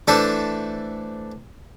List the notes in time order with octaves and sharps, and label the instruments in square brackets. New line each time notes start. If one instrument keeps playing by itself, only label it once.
[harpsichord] E3 A3 D4 A4 C5